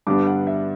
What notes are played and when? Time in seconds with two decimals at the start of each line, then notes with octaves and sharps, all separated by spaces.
0.07 G2 D3 G3 B3 D4 D6
0.27 F#5
0.47 E5